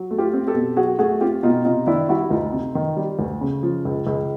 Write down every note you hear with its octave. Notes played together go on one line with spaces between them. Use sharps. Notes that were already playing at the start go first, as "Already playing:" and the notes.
Already playing: F#3
A3
F4 G4
C4
G4 A4
B2
F#3 F#4 G#4
A3 F#4 G#4
C4 F4 G4
B2 D#4 F4
C3 D#4 F4
D#3 D4 E4
G3 E4 F#4
D2 D#4 F4
C3
D#3
G3
D2
C#3
F3
C#2
C#2